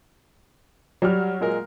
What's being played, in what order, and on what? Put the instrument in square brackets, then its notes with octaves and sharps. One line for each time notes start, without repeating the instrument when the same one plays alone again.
[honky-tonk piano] F#3 F#4 F6 [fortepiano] G3
[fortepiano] A#2 G#3 A#4